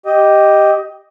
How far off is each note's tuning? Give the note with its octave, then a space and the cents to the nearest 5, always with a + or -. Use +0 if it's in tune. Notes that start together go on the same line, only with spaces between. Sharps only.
G4 +0 D#5 +0 D#6 +25